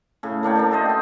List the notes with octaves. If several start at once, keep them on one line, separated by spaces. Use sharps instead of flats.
A2 C#3
A#3 D4 C#5 G5
A#3 D4 D5
A3 F#4 C5 D#5
G5 C6